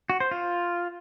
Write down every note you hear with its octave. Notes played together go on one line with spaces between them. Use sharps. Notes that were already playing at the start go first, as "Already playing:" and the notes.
F#4
C5
F4